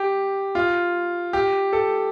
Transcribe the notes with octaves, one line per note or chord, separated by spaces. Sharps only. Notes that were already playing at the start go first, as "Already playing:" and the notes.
Already playing: G4
F4
G4
A4